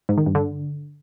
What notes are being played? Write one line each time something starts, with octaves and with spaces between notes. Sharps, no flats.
G#2
D#3
G2
D3